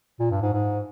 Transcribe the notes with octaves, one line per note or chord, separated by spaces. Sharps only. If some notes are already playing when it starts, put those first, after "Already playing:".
A#2
G2
G#2
G#2